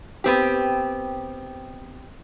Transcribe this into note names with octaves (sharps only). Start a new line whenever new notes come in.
B3 C4 G4